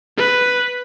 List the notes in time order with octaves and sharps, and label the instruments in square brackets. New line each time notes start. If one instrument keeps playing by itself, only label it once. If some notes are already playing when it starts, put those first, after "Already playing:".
[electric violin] B4